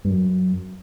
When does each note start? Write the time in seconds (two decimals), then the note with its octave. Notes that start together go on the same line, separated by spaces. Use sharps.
0.05 G2
0.10 F#2